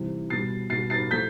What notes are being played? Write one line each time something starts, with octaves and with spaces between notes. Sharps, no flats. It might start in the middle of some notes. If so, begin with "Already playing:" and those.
Already playing: C3 E3 G3
B2 G3 A6 C7
B2 G3 A6 C7
A6 C7
A2 F3 A3 G6 B6